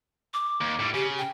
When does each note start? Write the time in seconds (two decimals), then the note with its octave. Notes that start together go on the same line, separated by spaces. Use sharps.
0.34 D6
0.61 D#2
0.79 A2 G3
0.94 C#3 G4
1.18 G5